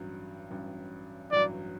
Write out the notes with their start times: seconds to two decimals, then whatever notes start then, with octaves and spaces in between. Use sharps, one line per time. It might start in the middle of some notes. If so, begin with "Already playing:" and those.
Already playing: A1 G2 F#3
0.51 A1 G2 F#3
1.32 A1 G2 F#3 D5